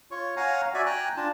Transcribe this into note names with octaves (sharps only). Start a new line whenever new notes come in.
F4 C#5 C#6
C#5 F5 F#5 G#5 A#5
F#4 D5 E5 G#5
G5 G#5 A#5 F#6
D4 F4 A5